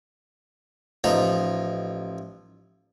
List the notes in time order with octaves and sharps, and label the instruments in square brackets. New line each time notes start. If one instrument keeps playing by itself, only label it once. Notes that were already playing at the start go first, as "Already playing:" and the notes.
[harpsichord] A1 F3 D#4 A#5